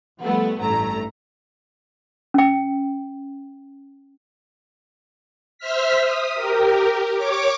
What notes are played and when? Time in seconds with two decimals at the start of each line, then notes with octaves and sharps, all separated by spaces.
0.21 F3 G3 A3 B3
0.59 A1 G2 A3 A#5
2.34 C#4 G5
5.58 C5 E5 F6 B6
6.01 D#6
6.35 G4 A#4
7.15 C#5 D6